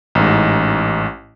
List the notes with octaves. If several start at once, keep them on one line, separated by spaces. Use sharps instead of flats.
A1 G#2